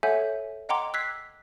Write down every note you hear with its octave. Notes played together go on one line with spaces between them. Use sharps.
A4 C#5 E5 F#5 G#5 G6
D#5 F#5 G5 A#5 C6 D6
E6 F#6 G#6 B6 C7